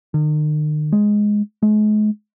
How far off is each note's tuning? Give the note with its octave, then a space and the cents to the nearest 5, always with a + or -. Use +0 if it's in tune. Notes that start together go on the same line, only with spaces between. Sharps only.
D#3 -45
G#3 +0
G#3 +40